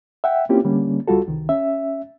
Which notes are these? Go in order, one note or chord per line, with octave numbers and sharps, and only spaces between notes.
E5 F#5 G5
A#3 C4 C#4 E4 F4 G4
D3 G3 A#3 C#4
C#2 G3 F4 F#4 A4
C2 D#3
C#4 E5